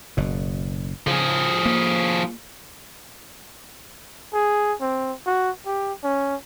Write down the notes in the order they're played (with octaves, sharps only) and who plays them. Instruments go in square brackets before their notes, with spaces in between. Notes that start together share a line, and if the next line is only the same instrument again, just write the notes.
[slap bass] F#1 B2
[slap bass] C#3 [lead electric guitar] F3 G#4
[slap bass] A#3
[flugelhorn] G#4
C4
F#4
G4
C#4